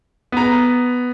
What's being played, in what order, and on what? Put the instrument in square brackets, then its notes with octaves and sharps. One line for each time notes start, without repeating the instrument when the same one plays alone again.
[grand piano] B3 A#5